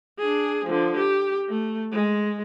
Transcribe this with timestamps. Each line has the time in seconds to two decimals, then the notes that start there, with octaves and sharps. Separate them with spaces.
0.19 D4 G#4
0.65 D3 F3
0.96 G4
1.49 A3
1.92 G#3